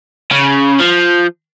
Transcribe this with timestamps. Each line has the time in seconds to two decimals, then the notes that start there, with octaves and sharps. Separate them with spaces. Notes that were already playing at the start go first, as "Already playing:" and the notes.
0.31 C#3
0.80 F3